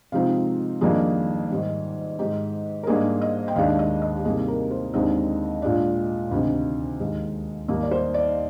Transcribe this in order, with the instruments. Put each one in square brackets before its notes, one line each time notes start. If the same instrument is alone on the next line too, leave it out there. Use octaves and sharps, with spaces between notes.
[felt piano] C3 F3 G#3 C4 D#4 F5
F2 D#3 G3 A#3 D4 G#4
G#2 D#3 G3
G#2 D#3 G#3 D#4 G4
A#4
G#2 G3 A#3 D4 G#4
D#5
G5
D#2 D#3 G#3 D4 F5
D#5
D#5
G4
C2 C3 G3 A#3 D#4 G#4
A#4
C5
D#2 D3 G#3 C4 D#4 D#5
A#2 G#3 D4
D2 C3 D#3
D#2 D#3 G#3
D#2 D#3 G3 A#3 D#5
D5
C5
D5